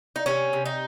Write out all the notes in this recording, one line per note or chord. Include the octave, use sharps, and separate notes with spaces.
D#4
C3 C#4
C3
D#4